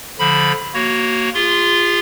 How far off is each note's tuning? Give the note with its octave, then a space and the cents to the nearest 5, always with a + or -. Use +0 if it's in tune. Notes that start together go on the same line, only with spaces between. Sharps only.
D3 -15 F3 +0 B5 +0
A#3 -5 F#4 +10 C#5 +0
F4 -5 G#4 -35 C6 +0